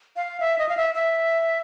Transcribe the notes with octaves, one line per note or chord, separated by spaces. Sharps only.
F5
E5
D#5
F5
E5
E5